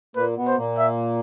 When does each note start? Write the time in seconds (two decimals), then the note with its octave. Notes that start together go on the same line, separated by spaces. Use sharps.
0.16 A#2 A#3 B4
0.37 B2 B3
0.47 C5
0.57 A#2 A#3
0.78 E5